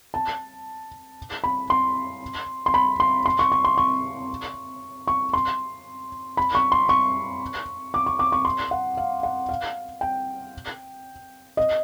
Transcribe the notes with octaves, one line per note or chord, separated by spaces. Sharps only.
A5
B5
C6
C6
B5
C6
C6
C#6
C#6
C6
C#6
C#6
C6
B5
C#6
C6
C#6
D6
C#6
D6
C#6
C6
F#5
F5
F#5
F5
G5
D#5